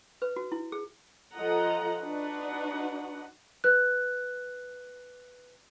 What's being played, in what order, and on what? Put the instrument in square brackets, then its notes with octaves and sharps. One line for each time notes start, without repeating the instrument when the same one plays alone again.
[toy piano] B4
F#4
E4
G#4
[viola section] F3 F4 A4 D#5 F#5 A#5
D4 D#4 F#4 B4 F#5
[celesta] B4 F#6